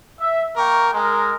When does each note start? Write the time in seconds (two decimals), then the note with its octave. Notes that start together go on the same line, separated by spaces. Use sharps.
0.20 E5
0.57 A#3 A#4 G5 C#6
0.94 G#3 A#4